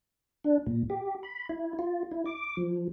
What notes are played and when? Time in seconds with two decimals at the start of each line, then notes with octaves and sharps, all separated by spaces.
0.44 D4
0.67 A#2
0.90 G4
1.23 B5
1.49 E4
1.79 F4
2.11 E4
2.25 D6
2.57 F3